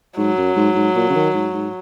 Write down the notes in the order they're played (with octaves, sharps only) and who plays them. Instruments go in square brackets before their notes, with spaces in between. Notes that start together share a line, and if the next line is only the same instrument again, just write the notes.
[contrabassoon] G#2 [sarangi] F#3
[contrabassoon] F#2
G#2
G#2
A#2
C#3
D#3
G#2
G#2